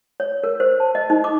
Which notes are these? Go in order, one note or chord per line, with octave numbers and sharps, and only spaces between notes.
C#5
A#4
C5
A5
D#5
D#4
D6